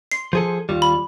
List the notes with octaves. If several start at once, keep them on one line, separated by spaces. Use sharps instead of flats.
C6 C7
F3 G#4 A4
D#2 G3 F4
B5